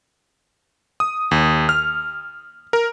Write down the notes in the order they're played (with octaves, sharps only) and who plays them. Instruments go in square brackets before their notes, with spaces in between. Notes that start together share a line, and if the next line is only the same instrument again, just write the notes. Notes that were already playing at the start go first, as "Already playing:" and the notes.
[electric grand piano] D#6
D#2
F6
A#4